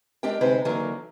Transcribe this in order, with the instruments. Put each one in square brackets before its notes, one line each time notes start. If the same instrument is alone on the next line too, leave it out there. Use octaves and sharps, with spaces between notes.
[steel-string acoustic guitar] G#3 D4 G4 A#4 G5
D2 C3 G#3 D#4 B4 C5
D3 E3 F#3 A#3 D#4 A#4